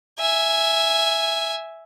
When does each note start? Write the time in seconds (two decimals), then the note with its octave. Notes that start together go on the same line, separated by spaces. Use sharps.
0.19 E5 G#5